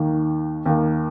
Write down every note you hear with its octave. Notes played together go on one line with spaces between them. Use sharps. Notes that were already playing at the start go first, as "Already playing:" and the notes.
Already playing: D#2 D#3 A#3
D#2 D#3 A#3